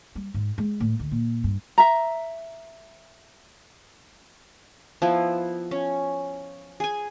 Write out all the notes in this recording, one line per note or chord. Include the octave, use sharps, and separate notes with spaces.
G3
G#2
G#3
A2
D2
A#2
G2
E5 A#5
F3 B3 E4
C#4
G#4 G#5